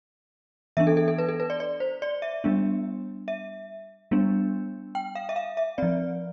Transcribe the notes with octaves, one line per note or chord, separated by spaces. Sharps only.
E3 B3 D4 E5
A4
A4
A4
B4
A4
B4
D5
D5
C5
D5
E5
G3 B3 D4
E5
G3 B3 D4
G5
F5
E5
F5
E5
F3 C4 D5